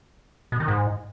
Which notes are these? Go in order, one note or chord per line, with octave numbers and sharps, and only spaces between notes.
B2
D#3
G#2